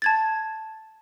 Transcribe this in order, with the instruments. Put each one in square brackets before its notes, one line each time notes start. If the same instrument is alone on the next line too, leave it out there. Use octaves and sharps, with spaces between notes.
[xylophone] A5 G#6 A6